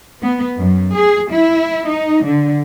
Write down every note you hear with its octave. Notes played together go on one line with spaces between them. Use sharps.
B3
F#2
G#4
E4
D#4
D3